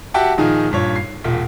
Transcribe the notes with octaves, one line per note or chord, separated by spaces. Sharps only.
F#4 G4 E5 F#5 G5 A5
A#2 D#3 F3 D#4 G#4
G2 A#2 C#5
C7
E1 A#2